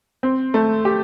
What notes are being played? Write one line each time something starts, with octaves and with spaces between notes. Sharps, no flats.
C4
A3
G4